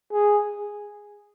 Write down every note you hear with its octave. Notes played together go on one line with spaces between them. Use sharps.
G#4